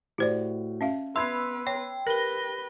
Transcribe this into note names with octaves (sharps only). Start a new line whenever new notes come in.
A2 F#4 G4 C5 D5
C#4 E5 F5
B3 B4 E5 B5 C6 E6 G#6 C7
C#5 G5
G4 A#4 B4 A#6 G7